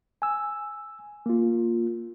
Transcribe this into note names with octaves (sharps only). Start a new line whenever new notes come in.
G#5 E6
A#3 F4